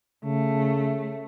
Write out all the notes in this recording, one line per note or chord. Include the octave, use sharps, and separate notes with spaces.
C#3 A3